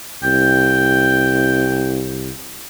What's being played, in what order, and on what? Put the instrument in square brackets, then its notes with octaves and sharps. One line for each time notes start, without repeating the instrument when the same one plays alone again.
[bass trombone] C2 [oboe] G5